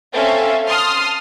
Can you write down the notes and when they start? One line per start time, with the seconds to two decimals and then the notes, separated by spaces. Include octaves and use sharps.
0.13 C4 C#4 A4 E5 F5
0.66 A5 C6 D#6 F6